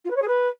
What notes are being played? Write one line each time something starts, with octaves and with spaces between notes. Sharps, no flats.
F4
B4
C#5
G#4
B4